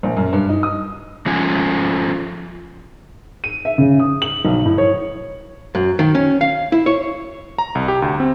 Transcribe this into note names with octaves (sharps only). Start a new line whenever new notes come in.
A#1
F#2
G2
D#4
D#6
F3 A3 C#4 F4 G#5
D#7
E5
C#3
D#6
F#7
B1
A2
C#5
F#2
D#3
C#4
F5
E4
C#5
A#5
C2
G4
D2
C4